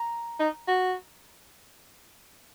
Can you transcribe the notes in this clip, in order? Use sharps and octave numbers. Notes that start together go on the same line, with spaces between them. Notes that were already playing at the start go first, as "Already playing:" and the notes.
Already playing: A#5
D#4
F#4